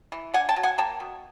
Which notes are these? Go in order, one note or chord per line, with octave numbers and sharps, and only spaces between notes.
E3
D4 F#5 G#5
G5 A5
F#3
F#5 G#5
A#3 G5 A5
B2